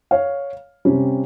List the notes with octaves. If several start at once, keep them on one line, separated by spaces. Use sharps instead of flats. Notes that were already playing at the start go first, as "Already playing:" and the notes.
C#5 F5
C3 G3 C#4